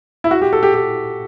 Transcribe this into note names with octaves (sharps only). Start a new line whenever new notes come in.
E4
F#4
G4
A4
G4
G4